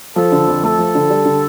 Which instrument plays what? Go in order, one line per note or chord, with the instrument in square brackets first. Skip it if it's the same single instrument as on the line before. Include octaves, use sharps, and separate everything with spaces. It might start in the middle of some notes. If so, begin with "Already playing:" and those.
[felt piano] F3 [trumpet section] A4
[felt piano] D3
F2
[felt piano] A3 [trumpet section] A4
[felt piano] F3
D3
G3
D3